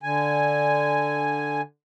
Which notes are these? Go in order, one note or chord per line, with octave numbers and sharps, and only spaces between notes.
D3 G#5